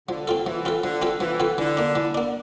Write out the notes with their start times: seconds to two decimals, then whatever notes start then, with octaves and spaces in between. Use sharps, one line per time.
0.09 D3 F3
0.28 C4 F4 A4
0.46 E3 F3
0.65 C4 F4 A4
0.84 D3 F3
1.02 C4 F4 A4
1.20 E3 F3
1.40 C4 F4 A4
1.58 D3 E3
1.77 A#3 D4
1.95 E3
2.15 A#3 D4